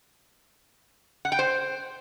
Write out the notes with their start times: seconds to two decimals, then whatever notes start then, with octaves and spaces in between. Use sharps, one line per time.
1.25 F#5
1.32 G5
1.39 C5